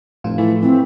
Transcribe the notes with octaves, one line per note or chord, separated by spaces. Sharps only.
F1 A2 F3 F4
E3 A3
E3 C4